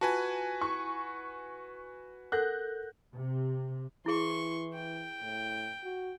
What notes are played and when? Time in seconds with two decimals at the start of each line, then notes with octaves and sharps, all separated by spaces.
0.01 F4 F#4 B4 G#5 A5
0.61 E4 C#6
2.32 A4 A#4 F#5 F#6 G6 A#6
3.15 C3
4.06 E3 E4 G#4 C6 C#6
4.73 G5
5.22 A2
5.84 F#4